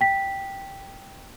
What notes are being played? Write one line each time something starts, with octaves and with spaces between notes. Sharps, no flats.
G5 B6